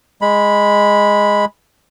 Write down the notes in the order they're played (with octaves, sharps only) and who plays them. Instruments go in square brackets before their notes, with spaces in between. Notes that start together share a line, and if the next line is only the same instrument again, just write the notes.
[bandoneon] G#3 B5